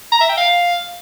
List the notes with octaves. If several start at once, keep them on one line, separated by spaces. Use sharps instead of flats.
A#5
E5
G5
F5